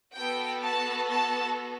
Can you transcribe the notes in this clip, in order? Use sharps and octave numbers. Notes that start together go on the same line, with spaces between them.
B3 F#4 A4 G5
A5
A5